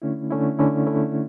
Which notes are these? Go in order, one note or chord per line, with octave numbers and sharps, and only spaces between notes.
D3 A3 C#4 E4
D3 A3 C#4 E4
D3 A3 C#4 E4
D3 A3 C#4 E4